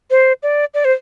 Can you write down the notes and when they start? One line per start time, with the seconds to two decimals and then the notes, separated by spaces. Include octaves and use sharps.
0.11 C5
0.43 D5
0.74 D5
0.85 C5